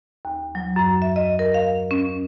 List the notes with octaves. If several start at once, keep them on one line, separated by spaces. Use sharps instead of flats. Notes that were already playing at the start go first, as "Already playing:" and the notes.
D#2
F#3
F#2
E5
D#5
A#4
F5
C#4